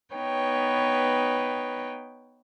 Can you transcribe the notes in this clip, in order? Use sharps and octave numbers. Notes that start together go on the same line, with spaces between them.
B3 D#4 B4 C#5 G5